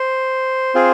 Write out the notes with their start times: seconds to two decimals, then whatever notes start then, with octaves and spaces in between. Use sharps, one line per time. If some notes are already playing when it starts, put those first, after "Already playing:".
Already playing: C5
0.75 C4 F4 G#4